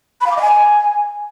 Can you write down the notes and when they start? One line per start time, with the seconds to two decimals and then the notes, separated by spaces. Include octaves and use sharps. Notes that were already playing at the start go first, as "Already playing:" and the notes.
0.21 B5
0.26 F5
0.31 D6
0.36 D#5
0.42 G#5